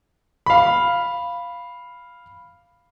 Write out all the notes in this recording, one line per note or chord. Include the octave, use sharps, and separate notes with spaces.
F5 B5